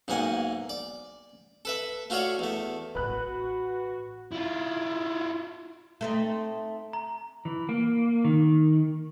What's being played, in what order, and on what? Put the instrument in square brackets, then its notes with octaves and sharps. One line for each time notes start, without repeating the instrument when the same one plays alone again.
[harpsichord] B1 G#2 A#3 F#5 G#5
D5
A4 B4 E5
A3 F4 F#4 C#5 D5 F5
E2 A3
[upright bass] A1 B3 [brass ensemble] F#4 [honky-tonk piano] B4 F#6
[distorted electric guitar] E4 F4
[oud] A3 C4 D#4
[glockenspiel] A#5
[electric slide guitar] E3
A#3
D#3